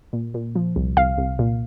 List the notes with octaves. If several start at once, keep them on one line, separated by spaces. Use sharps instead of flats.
A#2
A#2
F3
C2
C2 F5
C2
A#2